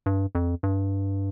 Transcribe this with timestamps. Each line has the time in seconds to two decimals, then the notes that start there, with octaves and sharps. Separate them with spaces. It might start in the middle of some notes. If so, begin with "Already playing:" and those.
0.06 G2
0.35 F2
0.63 G2